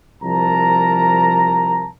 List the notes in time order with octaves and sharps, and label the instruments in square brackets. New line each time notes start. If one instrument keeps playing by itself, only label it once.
[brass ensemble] C2 F3 A#4 A5 A#5